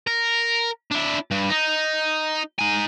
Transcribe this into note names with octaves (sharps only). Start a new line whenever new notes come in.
A#4
D4 E4
G2
D#4
D#4 G#5